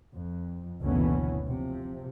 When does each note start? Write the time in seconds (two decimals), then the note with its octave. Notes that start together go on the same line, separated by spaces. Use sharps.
0.13 F2
0.81 F#1 D2 B2 E3 B3 C#4
1.48 C3 F3